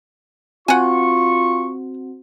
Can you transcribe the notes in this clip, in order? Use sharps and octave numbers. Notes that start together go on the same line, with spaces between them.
C4 F4 F#4 F#5 G#5 C#6